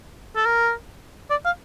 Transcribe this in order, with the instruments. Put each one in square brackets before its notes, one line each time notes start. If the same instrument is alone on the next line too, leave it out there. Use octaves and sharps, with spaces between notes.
[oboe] A4
A#4
D5
F5